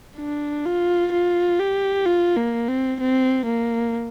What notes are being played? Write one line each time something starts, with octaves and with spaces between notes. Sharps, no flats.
D4
F4
F4
G4
F4
A#3
C4
C4
A#3